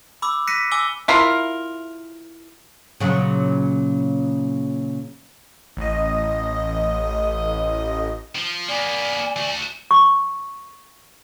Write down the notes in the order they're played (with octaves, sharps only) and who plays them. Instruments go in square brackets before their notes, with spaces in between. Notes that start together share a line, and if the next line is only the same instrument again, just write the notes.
[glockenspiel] B5 D6 E6
F#6 A#6 B6 C#7 D#7
G#5 D6 E6 G7
[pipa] E4 F4 A#4
[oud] A#2 C#3 F#3
[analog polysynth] A1 D#5
[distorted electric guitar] F3
[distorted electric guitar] A#3 B3 [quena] D5 [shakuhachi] G#5
[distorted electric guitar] A3 F#4
[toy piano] C#6